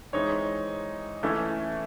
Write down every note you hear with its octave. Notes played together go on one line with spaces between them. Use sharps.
E3 G#3 C4 D#4 C#5
E3 A3 C#4 E4